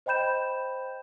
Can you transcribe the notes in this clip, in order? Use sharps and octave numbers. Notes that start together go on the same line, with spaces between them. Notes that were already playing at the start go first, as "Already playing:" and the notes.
C5 D#5 G5 B5 G6 E7